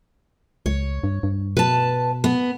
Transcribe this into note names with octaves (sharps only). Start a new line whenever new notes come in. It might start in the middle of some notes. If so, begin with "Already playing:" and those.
C#2 C#5
G2
G2
B2 B4 A5
B3